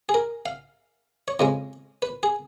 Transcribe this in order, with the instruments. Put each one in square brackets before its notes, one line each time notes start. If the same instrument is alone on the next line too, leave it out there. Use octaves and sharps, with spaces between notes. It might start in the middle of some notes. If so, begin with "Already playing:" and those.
[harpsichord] G#4
A#4
F5
C#5
F2 C#3 G#3 D#5
B4
G#4